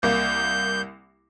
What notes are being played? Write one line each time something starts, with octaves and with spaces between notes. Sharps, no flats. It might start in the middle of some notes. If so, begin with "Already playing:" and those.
C2 A#3 G6